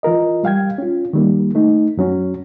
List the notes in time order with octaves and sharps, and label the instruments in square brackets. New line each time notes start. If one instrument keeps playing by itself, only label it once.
[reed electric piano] E3 F4 A#4 D#5
G3 F5 G5 G#6
C#4 F4
D#3 G3 A#3
A3 D#4
F#2 F#3 C#4